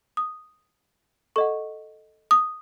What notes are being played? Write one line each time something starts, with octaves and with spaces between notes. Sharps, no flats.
D#6
A4 D#5 F#5 C#6
D#6